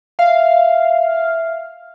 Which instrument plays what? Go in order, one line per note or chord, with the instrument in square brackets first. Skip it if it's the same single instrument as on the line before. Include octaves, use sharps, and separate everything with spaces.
[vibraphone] E5 [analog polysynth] F5